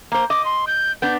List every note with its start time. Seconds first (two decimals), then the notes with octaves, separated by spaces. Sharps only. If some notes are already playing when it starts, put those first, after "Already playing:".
0.12 A#3 C5
0.30 D#5 D6
0.45 C6
0.67 G6
1.02 B3 D4 G6